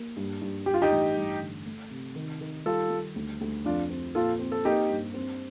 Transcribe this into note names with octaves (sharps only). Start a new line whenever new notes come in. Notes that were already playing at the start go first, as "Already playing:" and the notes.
Already playing: A#3
G2
G2
G2 G4
F4
D#4 G4
A1
G2
D3
A3
C3
D#3
D#3
G3 F4 A4
G3
D2
D2
F2 D4 F4
C4
A#2 F4 A4
C4
A4
A#3 D#4 G4
G2
C4